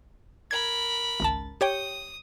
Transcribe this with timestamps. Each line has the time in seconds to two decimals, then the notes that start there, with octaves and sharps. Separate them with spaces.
0.51 A#4 B5 G#6
1.20 G#1 C#2 A5
1.61 G4 C#5 G5 D#6